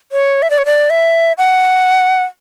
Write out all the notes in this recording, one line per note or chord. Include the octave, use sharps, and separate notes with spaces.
C#5
E5
D5
C#5
D5
E5
F#5